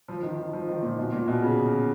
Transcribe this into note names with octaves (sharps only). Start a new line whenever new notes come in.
F3
D#3
D#3
F3
D#3
A#2
B2
A#2
B2
C#3